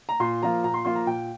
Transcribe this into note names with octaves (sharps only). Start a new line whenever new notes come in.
A#5
A#2 C6
F3 A#3 F4 A#5
A#2 A#5
C6
F3 A#3 F4 C6
A#5
A#2 G5